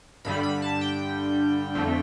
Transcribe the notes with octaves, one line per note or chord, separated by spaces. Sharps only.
G2 D3 G3 B5
B5
A5
G5
F2 D3 A3